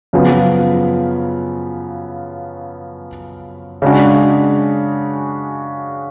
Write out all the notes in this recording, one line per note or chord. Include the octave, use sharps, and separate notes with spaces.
F#2 C#3 F3 B3
C#3 G#3 D4 F#4